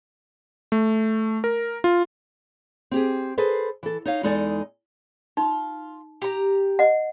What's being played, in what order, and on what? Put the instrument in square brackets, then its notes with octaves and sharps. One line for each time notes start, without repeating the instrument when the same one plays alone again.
[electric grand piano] A3
A#4
F4
[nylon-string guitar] C4 G4 G#4
G#4 A4 B4 C5
E3 A4
D#4 C#5 F5
E2 G#3 D#4 A4 D5 G#5
[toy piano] D#4 [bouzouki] F4
[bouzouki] G4 A#5
[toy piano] D#5 F#5